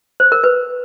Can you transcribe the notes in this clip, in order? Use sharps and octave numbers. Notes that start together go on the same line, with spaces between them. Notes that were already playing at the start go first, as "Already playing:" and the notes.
C5
A#4
B4